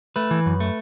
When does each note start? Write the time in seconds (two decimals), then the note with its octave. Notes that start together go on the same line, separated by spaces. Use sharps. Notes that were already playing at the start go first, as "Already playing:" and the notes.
0.16 A3 B4
0.31 E3
0.46 F#2
0.60 A3